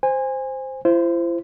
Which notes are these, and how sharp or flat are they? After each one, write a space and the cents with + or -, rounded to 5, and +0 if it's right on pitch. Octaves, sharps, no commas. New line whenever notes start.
C5 +0 G#5 -25
E4 +45 C5 -5